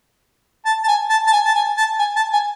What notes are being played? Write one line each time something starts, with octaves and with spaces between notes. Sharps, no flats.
A5
A5
G#5
A5
A5
G#5
A5
G#5
A5
G#5
A5
G#5